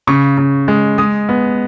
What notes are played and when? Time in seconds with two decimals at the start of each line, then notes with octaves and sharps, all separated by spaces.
0.07 C#3 C#6
0.38 C#3
0.68 G#3
0.98 G#3 D#6
1.29 B3